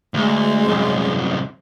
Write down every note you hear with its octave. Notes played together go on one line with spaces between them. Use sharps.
D2 G#3
C2 F#2